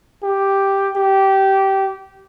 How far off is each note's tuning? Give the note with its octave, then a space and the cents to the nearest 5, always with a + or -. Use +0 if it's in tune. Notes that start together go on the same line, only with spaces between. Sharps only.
G4 +0
G4 -15